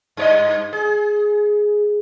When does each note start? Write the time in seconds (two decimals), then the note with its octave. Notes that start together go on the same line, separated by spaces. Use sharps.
0.17 G2 C#5 D#5
0.73 G#4